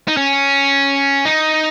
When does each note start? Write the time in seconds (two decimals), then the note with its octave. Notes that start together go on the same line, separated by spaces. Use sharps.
0.08 D#4
0.17 C#4
1.25 D#4